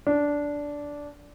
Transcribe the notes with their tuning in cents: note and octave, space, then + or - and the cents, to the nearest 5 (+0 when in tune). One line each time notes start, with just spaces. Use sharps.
D4 -10